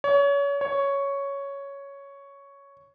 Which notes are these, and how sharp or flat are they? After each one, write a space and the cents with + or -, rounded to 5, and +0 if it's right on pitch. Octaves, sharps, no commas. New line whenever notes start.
C#5 +30
C#5 +5